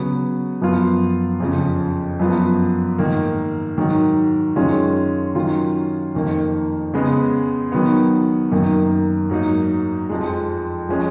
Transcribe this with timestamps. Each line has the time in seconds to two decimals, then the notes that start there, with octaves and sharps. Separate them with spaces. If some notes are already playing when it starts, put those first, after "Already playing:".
Already playing: C#3 F#3 B3
0.61 F#2 F3 B3 F4
1.40 F2 C#3 F3
2.19 F#2 F3 B3 F4
2.98 G#2 D#3 A#3
3.78 G#2 D#3 F#3
4.56 F#2 D#3 G#3 C#4 F4
5.35 D#3 F#3 C#4 F4
6.15 F2 D#3 A#3
6.94 C#3 G#3 B3
7.72 D#3 F#3 B3
8.51 F#2 D#3 A#3
9.30 G#2 F#3 A#3 D#4
10.09 F2 F3 G#3
10.89 F3 G#3 C#4